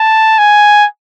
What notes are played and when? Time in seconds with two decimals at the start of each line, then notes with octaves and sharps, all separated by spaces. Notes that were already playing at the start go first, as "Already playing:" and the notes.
Already playing: A5
0.38 G#5